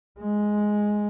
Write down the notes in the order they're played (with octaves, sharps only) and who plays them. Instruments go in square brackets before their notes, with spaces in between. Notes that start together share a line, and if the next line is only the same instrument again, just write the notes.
[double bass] G#3